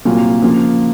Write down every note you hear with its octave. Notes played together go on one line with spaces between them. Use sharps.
C2 A#2 F#3 A#3 F4
C#3 F3 A#3 F4